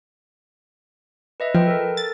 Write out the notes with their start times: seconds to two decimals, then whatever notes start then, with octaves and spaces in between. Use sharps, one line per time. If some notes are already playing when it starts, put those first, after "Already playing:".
1.40 B4 D#5 E5
1.55 F3 B4 G5
1.67 A4 A#4
1.97 A6